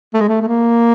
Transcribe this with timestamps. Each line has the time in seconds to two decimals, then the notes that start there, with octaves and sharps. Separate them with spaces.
0.14 A3
0.21 G#3
0.28 A3
0.42 A3
0.47 A#3